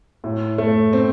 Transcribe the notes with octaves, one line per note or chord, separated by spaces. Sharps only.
A2
A3
C4